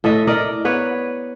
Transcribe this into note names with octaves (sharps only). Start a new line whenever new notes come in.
A2 A4 D#5 E5
A#4 D5 D#5
B3 B4 C#5